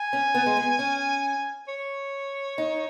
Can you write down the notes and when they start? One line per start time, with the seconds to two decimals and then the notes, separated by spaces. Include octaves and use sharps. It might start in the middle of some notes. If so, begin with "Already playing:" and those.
Already playing: G#5
0.13 C#4
0.34 B3
0.46 G#3
0.57 B3
0.79 C#4
1.68 C#5
2.58 D#4